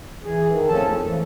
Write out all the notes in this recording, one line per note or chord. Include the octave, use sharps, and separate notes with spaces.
E3 G#4
D#3
F2 A2 F3 C#4 A4 A5
F2
E3 F3